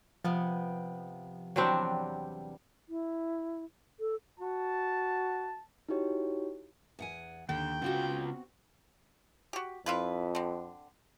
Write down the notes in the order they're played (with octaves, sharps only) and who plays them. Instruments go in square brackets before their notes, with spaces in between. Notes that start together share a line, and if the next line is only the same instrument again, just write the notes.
[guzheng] C3 B3 [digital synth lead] F3
[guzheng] E2 G3 E5 [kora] F#3 C4 D4
[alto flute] E4
A4
[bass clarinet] F#4 [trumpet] A5
[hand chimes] D#4 E4 F#4 G4 C#5
[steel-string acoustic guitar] E2 F#5 G#5
[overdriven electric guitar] D#2 [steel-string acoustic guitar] D3 [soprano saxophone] G5
[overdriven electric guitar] C#3 F4 [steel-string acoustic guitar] B3 C4 F#4
[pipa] F#4 G4
[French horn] F2 [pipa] E4 F4 B4
[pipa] D3 C4